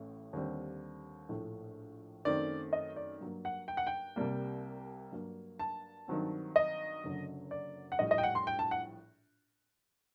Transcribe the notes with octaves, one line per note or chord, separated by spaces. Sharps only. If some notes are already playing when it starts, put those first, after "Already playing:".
Already playing: A1 A2 A3
D#2 D3 G3 C4
A#1 A2 A3
F#2 D#3 A3 C4 D5
D#5
D5
G2 F#3 A#3
F#5
G5
F#5
G5
C2 C3 G3 A#3
G2 F#3 A#3
A5
G2 D#3 F#3 C4
D#5
F#1 F#2 D3 F#3
D5
F#5
A#1 A2 G3 D#5
D#5
G5
F#5
C6
G5
A5
F#5